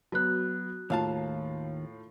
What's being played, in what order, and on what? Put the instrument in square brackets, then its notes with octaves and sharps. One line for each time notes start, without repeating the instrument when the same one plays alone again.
[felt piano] F#3 B3 [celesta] F#4 F#6
[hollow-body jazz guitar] D#2 F5 A5 [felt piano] A2 F4